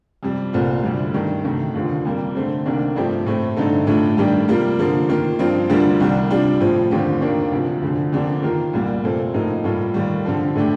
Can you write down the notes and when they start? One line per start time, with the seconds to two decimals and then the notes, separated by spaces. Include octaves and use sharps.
0.23 F2 C3 G3
0.53 C2 A#2 A3 C4 F4
0.83 D2 C3 G3
1.14 G2 D#3 A3
1.45 D2 C3 D#3 A3
1.75 D#2 D3 F3
2.05 F2 C3 G3 A#3
2.35 D3 A3 C4
2.66 C2 C3 D#3 A#3 D4
2.96 G2 F3 A3 C4 G4
3.26 A2 A3 C4
3.57 G2 D3 A3 D#4 A4
3.87 A2 A3 D4 F4
4.17 G2 D#3 G3 D4 G4
4.48 C3 G3 A#3 F4
4.79 D3 F3 A#3 F4
5.09 D#3 A#3 F4
5.39 G2 F3 C4 F4
5.70 D2 D3 G3 A#3 F4
6.00 C2 C3 D#3 G3
6.30 C3 G3 D4 F4
6.60 A2 F3 C4
6.91 D#2 D3 F3 C4 G4
7.21 D#2 D#3 A#3 D4
7.52 D2 C3 F3
7.83 D2 D3 F3
8.13 F2 D3 F3 A#3 D4
8.43 D#3 A#3 F4 A#4
8.73 C2 A#2 G3 A#3
9.03 A#2 A3 C4 F4 A4
9.34 A2 F3 A#3 D#4 A4
9.64 A2 G3 A#3 F4 A4
9.94 D#2 D#3 G3
10.25 D3 F3 C4 F4 A4
10.55 A2 A3 D4 G4